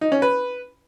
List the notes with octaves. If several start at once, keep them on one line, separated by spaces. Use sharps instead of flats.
D#4
C#4
B4